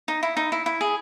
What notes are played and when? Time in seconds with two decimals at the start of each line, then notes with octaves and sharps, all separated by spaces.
0.08 D#4
0.23 E4
0.37 D#4
0.52 E4
0.66 E4
0.81 G#4